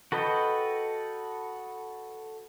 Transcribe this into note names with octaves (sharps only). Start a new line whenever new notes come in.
F#4 A4 B4 D#5 G5